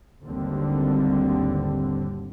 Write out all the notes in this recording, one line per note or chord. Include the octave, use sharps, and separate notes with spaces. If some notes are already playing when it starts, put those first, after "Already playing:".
G#1 D#2 D3 G3 C4